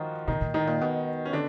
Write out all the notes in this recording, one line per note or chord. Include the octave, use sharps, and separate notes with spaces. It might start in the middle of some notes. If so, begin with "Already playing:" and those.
Already playing: D#3 F3 D#4 F4 F#4
B2 D#3 D#4
A#2
A2 D#3 D#4
A#2
B2
C#4
D3 D4